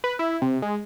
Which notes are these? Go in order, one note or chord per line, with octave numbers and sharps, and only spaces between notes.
B4
E4
C3
G#3